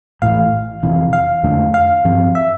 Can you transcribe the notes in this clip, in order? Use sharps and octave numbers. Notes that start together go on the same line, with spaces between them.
A1 A2 E3 F5
F1 F2 C3 E3
F5
F2 D3 A3 D4
F5
G2 F3 C4
E5